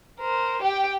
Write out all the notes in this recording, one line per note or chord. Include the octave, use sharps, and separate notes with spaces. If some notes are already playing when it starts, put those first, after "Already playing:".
A#4 C5
G4 G5